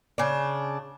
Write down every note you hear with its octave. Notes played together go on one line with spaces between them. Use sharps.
C#3 D4